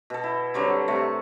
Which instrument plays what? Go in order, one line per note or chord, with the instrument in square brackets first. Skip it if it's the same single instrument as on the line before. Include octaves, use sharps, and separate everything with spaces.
[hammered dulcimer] B2 A4
E4
D3 F#3 G3 C4
C3 A3 C#6